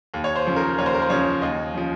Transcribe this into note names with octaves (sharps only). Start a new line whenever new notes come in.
D#2
C#5
C5
C#3 F3
A#4
D#2 C#5
C5
A#4
C5
C#3 F3 C#5
D#2 D#5
C#3 F3